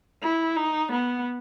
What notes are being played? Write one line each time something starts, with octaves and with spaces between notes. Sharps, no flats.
E4
D#4
B3